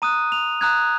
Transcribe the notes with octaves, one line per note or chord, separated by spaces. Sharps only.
A#5 D#6 F#6 D#7
F7
A#5 D#6 F#6 G#6